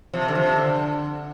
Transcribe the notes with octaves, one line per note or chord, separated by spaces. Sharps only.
C3 F3
D3
C3 F3
D3